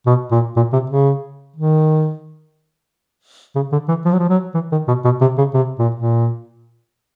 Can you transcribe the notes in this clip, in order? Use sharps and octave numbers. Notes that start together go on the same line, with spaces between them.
B2
A#2
A#2
C3
C#3
D#3
C#3
D3
E3
F3
F#3
F3
F#3
E3
D#3
B2
B2
C3
C#3
C3
A#2
A#2